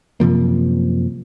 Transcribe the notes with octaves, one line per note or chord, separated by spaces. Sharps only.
F#2 C3 F3 A#3